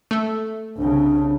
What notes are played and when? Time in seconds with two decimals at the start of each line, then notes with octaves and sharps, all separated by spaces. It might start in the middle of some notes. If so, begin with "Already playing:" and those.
0.11 A3 A4
0.77 C2 C#3 D4